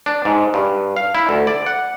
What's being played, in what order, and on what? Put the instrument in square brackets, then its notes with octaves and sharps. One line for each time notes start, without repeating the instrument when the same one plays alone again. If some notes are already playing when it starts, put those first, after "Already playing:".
[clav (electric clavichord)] D4
G#2
G2
F5
E4
D2
D5
F#5